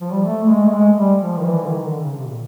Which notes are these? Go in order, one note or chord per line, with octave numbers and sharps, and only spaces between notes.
F3
G3
A3
A3
G#3
A3
G#3
G3
F3
D#3
E3
D3
D#3
D3
C#3
C3
A#2